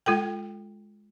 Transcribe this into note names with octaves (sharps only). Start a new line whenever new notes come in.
G#3 F4 A4 G5